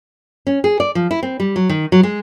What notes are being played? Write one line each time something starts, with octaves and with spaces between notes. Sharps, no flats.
C#4
G#4
D5
F3
E4
C4
G3
F#3
D#3
F#3
G#3